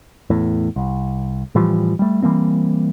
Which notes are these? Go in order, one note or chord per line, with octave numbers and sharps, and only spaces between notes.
E2 A2
C2
A2 E3 F3 G3
G3 A3
E3 G3 A#3 C4